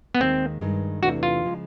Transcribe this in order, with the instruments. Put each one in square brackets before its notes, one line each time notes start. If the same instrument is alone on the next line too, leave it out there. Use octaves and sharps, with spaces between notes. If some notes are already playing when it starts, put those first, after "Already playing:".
[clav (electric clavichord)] B3
[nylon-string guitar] D#2 D#3 G#3 [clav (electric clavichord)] C4
[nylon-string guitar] G2 D#3 G#3
[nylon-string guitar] E2 C3 E3 A3 D4 [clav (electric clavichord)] F#4
[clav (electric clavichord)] F4
[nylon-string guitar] C#3 F3 G#3